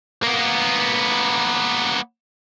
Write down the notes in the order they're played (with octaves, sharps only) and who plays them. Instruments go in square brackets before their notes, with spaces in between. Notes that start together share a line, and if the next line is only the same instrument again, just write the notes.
[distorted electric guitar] A#3 B3